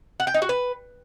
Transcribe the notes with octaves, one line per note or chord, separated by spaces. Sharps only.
F#5
G5
D#4
F#4
B4